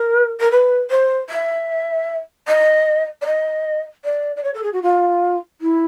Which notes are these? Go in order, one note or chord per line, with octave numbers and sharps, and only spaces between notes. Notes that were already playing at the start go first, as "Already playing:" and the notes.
Already playing: A#4
A#4
B4
C5
E5
D#5
D5
D#5
D5
D5
C#5
A4
G#4
F#4
F4
E4